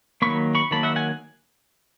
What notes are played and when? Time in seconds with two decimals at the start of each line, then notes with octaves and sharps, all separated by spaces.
0.22 D#3 F#3 A#3 B5 C#6
0.55 B5 C#6
0.71 D#3 F#3 A#3 A5 B5
0.83 E5 F#5
0.96 F#5 G#5